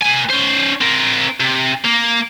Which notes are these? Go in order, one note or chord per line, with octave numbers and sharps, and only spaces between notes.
A#3 G#5
C#4 C5
C4 A#4
C3
A#3